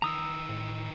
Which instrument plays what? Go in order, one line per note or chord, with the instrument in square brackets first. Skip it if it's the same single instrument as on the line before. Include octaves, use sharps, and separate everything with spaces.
[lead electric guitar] D#3 E3 [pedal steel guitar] A#5 D#6 E6
[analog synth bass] A2